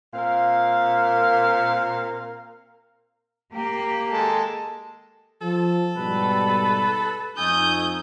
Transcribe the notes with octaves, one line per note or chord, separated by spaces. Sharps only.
A#2 C4 A#4 F5
A#3 G4
G#3 A4
F3 A4
G#2 B2 G3 B4
F2 A3 D#4 G#5 D#6 G6